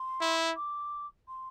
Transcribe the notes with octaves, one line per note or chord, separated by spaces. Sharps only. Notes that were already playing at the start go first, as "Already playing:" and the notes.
Already playing: C6
E4
D6
C6